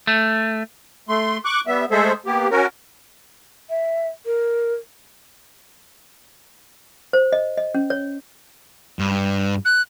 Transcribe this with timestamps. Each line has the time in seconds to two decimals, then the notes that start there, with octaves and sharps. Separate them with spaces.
0.07 A3
1.09 A3 C6
1.45 C#6 D6 F#6
1.67 G3 B3 E5
1.91 G#3 A3 G#4 A4 C5 E5
2.26 A#3 B3 G4
2.51 C#4 F#4 A#4
3.70 E5
4.26 A#4
7.13 C5
7.33 D#5
7.58 D#5
7.74 C#4
7.90 C#5
8.99 G2
9.65 F#6